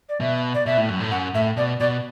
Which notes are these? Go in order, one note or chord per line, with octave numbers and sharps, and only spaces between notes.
D5
B2 E5
D5
B2 E5
A2
F#2
A2
F#2 F#5
A2 E5
B2 D5
B2 D5